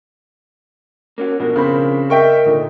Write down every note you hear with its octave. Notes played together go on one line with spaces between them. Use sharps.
A#3 C#4 F#4
B2 F3 D4 A#4
C#3 C4 B5
A#4 D#5 E5 G5 C#6
A#2 D3 D#4